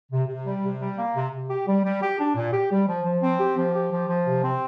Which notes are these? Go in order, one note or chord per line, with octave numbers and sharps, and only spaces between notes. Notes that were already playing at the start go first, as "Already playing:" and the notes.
C3
C3
G3
C3
G3
A#3
C3
C3
G4
G3
G3
G4
D4
A#2
G4
G3
F3
F3
C4
G4
F3
G4
F3
F3
C3
C4